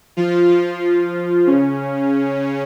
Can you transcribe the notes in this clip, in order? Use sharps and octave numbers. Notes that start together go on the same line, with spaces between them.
F3 F4
F3 F4
C#3 C#4